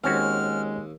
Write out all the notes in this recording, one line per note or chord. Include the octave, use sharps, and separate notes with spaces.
D#2 G#3 C4 C#4 F#4 F6